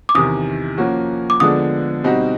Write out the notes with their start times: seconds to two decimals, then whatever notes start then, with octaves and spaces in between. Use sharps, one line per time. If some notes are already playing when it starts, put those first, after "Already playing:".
0.09 D6
0.15 E2 C3 D#3 D#6
0.78 F3 A#3 C#4 F#4
1.30 D6
1.40 D3 F3 G#3 B3 D4 D#6
2.04 B2 G3 C4 D#4 F#4